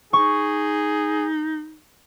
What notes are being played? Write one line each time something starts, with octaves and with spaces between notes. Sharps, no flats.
D#4 G#4 C#6